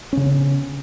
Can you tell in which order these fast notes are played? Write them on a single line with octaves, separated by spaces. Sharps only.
C#4 C#3 B3